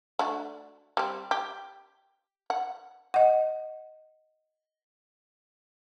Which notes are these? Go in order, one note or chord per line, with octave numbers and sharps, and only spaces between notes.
A3 D4 F#4
G3 C4
G4
F#5
D#5 F#5